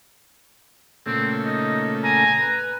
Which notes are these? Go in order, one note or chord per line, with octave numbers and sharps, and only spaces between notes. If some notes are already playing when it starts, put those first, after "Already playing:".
A#2 C#3 A3 C4
D#4 D#5
G#5 A#5
B4